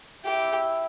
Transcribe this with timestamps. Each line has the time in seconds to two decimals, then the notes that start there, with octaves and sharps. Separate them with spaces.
0.25 E4 G4